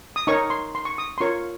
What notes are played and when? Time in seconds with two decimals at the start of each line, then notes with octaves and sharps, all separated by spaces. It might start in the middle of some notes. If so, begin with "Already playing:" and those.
0.16 D#6
0.27 D#4 A#4 C#5 C#6
0.50 C6
0.75 C6
0.85 C#6
0.98 D#6
1.18 C6
1.21 F4 A#4 C#5 C#6